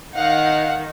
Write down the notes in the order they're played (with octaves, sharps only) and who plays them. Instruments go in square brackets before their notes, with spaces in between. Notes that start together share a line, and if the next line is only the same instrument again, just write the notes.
[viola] D#3 D#4 [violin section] F5 F#5